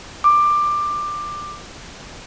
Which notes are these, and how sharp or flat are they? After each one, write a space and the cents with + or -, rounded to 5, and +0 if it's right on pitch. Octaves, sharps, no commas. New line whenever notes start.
D6 +15